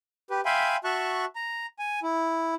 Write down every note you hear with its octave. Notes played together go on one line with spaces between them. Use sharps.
G4 B4
E5 F5 G5 G#5 B5 C6
F#4 E5 A5 C#6 F#6
A#5
G#5
E4